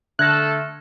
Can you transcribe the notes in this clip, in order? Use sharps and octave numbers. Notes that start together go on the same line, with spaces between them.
D3 A3 A4 E5 F6 F#6 G#6 A#6